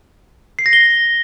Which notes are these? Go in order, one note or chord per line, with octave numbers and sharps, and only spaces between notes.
C7
A#6
G7